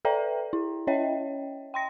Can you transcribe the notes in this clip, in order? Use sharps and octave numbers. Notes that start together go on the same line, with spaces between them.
A4 B4 D5 E5 G5 A#5
E4
C#4 C#5 D#5 E5 G5
G5 C6 A#6